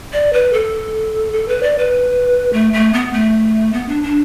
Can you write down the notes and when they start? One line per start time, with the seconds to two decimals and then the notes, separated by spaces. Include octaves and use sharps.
0.13 D5
0.33 B4
0.53 A4
1.33 A4
1.48 B4
1.63 D5
1.78 B4
2.53 A3
2.73 A3
2.93 B3
3.13 A3
3.73 B3
3.89 D4
4.03 D4